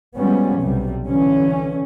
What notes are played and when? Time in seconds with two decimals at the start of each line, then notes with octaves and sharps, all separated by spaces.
0.17 F3 G3 G#3 B3 C#4
0.61 B1 C3 G3
1.06 D3 E3 C#4